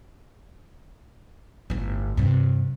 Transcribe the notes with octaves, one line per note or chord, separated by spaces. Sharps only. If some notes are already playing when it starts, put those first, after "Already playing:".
G1 A2
G2 C3